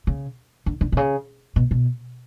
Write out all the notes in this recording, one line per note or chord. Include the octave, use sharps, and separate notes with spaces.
C#3
D3
D3
B2
C#3
B2
B2